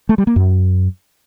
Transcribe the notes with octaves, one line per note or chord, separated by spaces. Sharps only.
A3
G3
A#3
F#2